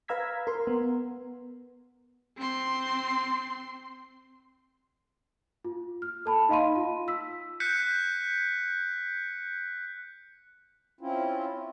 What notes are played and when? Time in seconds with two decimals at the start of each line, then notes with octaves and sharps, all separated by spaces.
0.08 B4 F5 A#5 E6 G#6 B6
0.47 A#4 C6
0.67 B3
2.38 C4 C6
5.65 F4
6.02 F6
6.26 A4 A5 B5
6.49 D#4 D#5 F5 B5 C6 D#7
6.76 F4
7.08 E6 B6
7.60 F#6 G6 B6 C#7
11.01 C4 C#4 E4 F4